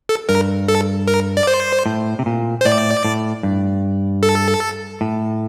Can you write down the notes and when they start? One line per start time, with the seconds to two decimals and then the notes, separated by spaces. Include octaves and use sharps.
0.09 A4
0.29 G2 A#4
0.68 A4
1.08 A#4
1.37 D5
1.47 C5
1.86 A2
2.19 C3
2.26 A#2
2.61 C5
2.65 A2 D5
3.05 A2
3.43 G2
4.23 A4
5.01 A2